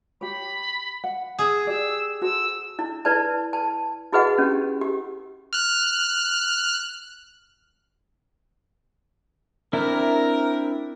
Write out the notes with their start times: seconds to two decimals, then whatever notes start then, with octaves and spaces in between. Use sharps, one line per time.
0.21 G4 C#5 B5
1.04 F#5
1.39 G#4 E6
1.67 G4 D5 E6
2.22 F#4 A4 C5 E6
2.79 E4
3.05 E4 B4 D5 A5
3.53 A5
4.12 E4 F#4 G#4 B4 D#5 F#5
4.38 C#4 G4
4.81 G4
5.53 F6 F#6
9.73 C4 D4 E4 A#4